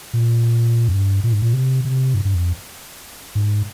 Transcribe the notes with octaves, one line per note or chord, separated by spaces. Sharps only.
A#2
F2
G2
A#2
G#2
A#2
C3
C3
G2
G2
F2
G#2